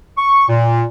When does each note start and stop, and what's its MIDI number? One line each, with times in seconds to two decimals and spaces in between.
0.18 0.45 85
0.48 0.84 46